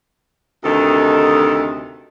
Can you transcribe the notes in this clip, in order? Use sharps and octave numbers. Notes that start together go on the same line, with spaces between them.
D2 C3 D#3 D#4 A4